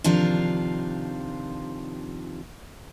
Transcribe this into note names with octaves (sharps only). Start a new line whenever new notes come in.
C3 D#3 F3 D4 F4